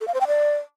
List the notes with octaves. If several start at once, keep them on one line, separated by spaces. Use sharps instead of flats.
A4
F5
C5
G5
D5